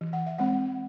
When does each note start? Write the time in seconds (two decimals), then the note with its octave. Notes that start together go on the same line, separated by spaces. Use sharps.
0.01 E3
0.13 F#5
0.26 E5
0.38 G#3 C4 F#5